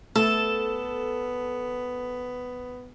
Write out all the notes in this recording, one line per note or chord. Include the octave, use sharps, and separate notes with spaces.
A3 B3 A4